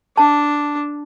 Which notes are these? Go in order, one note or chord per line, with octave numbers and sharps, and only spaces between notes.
D4 A5